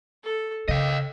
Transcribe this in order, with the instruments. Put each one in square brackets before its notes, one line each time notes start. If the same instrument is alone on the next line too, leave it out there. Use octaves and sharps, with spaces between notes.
[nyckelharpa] A4
[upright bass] C#3 [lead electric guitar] D#5 F5 [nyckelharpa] G5